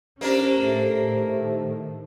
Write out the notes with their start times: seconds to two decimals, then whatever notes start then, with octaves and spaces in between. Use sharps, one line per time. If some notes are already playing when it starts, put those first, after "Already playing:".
0.21 A#3 C#4 D4 G4 A#4 C5
0.58 A2 A3
1.06 A2 D#3